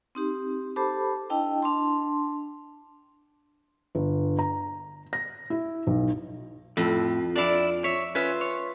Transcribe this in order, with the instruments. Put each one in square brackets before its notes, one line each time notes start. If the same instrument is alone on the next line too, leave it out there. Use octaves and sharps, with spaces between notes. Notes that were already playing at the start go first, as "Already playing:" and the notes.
[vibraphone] C4 D#4 G4
G4 A4 C5 A5 B5 D6
D4 E4 D#5 G5 A5
D4 A5 C6
[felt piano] G1
A#5
A#6
E4
B1
[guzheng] F2 [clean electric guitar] A2
[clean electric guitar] D4 E4 [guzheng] D5 F5
[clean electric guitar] C#5 [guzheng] E5
[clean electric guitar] C#4 [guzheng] F4 B4 E5
[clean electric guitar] C#5